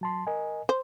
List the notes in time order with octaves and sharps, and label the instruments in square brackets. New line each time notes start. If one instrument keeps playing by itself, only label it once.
[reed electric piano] F#3 A5 C6
A#4 D#5 G#5
[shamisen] C5